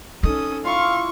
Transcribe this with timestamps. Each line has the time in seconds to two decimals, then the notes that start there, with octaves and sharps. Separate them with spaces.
0.23 C#4 D#4 A4 D#6
0.65 E4 F4 F5 C#6